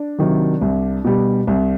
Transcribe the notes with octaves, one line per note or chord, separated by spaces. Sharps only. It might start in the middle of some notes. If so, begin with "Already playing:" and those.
Already playing: D4
C3 D#3 F#3
C2
B2 G3
C2